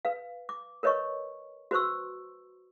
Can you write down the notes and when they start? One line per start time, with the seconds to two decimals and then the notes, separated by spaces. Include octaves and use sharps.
0.05 B4 F5
0.49 D6
0.83 A#4 B4 C#5 D#5 C#6
1.71 F#4 B4 C5 C6 C#6 E6